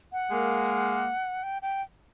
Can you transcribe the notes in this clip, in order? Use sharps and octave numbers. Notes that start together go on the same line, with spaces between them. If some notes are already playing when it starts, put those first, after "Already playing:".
F#5
G#3 A#3
G5
G5